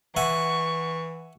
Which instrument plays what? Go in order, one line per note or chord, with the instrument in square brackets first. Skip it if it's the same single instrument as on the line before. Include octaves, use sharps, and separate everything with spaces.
[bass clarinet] E3 [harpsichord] E5 F#5 G#5 [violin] C#6